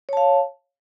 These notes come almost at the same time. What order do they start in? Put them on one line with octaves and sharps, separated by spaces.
C#5 A5 F5